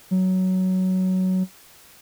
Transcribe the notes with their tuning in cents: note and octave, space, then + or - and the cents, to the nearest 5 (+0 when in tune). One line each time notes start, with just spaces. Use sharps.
F#3 +10